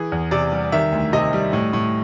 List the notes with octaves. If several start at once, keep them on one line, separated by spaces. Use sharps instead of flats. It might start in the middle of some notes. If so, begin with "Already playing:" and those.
Already playing: E3 G#4
E2
C3 D5
G3
D#3 E5
D2
C3 D#5
G3
A2
A2